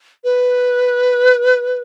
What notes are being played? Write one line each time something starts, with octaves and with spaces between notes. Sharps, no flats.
B4